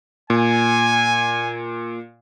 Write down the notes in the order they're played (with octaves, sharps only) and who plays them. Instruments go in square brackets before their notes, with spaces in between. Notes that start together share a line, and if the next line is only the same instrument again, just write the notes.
[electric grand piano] A#2 [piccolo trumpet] G#5